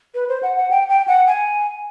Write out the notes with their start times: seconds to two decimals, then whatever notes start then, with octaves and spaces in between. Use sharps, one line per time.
0.15 B4
0.29 C5
0.43 F#5
0.57 F#5
0.71 G5
0.89 G5
1.07 F#5
1.27 G#5